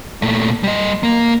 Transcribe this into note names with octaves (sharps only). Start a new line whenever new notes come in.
A#2 A3
G3 D#5
A#3